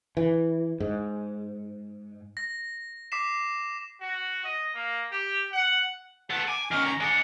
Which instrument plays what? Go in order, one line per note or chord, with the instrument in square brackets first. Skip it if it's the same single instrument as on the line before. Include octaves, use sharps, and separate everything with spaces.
[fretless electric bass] E3
G#2
[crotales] A#6
D6 B6 C7 E7
[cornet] F#4
D#5
A#3
G4
F#5
[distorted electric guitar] B3 A4 [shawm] F#5
[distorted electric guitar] G#5 [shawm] D6
[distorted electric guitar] D#3 C#4 [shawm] A#4
[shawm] A#5
[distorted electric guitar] G#3 F#5 [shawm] D4